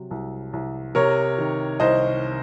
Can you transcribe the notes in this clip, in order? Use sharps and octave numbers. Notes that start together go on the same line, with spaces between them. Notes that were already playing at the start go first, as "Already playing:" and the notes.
Already playing: C3 F#3
C2
C2
C3 A#4 C#5
D#3
C2 C5 D#5